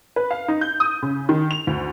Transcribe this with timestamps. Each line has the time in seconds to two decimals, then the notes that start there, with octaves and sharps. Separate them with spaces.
0.16 B4
0.31 F5
0.48 D#4
0.61 G6
0.80 D#6
1.02 C#3
1.29 D#3
1.51 F7
1.67 D2